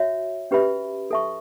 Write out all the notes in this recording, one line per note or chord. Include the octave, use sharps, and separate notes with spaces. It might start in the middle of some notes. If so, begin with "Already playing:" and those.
Already playing: F#4 C#5 E5
C#4 G4 B4 E5 B5
A4 E5 A5 C#6